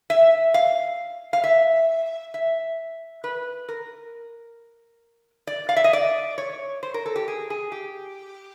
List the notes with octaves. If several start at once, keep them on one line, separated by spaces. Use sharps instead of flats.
E5
F5
F5
E5
E5
B4
A#4
D5
F5
E5
D#5
D5
C#5
C5
A#4
A4
G4
G#4
G#4
G4